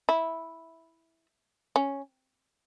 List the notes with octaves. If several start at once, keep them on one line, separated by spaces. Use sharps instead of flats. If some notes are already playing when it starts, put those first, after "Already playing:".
E4
C#4